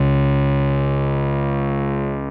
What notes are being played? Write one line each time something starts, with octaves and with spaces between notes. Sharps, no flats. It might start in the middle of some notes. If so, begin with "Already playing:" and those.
Already playing: C#2 C#3